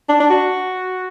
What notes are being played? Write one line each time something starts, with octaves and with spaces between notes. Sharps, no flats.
D4
D4
F#4